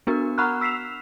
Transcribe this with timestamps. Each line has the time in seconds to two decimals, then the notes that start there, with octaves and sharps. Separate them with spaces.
0.07 B3 D4 F#4 A#4
0.38 F#5 A#5 B5 C#6 F6 F#6
0.61 E6 B6 C7 E7 F7